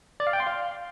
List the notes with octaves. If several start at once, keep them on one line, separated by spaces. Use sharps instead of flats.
D5
F5
G5
C6
F5